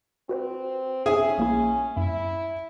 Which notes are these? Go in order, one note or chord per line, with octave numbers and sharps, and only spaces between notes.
C4 F#4 B4 C5
C#4 G#4 E5 G#5
A#1 A#3 E4
F#2 E4